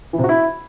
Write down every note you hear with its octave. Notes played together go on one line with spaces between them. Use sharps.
E3
C3
F#4
E4